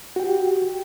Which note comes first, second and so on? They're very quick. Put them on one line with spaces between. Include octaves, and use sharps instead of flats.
F#4 G5 G4